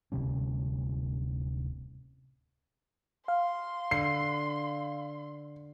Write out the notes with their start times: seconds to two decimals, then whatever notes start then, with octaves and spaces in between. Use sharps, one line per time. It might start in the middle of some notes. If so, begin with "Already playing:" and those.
0.12 D1 C3 G3 C#4
3.28 F5 C6
3.91 D3 C7